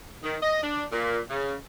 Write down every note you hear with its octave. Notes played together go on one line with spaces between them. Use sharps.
D#3
D#5
D4
A#2
C#3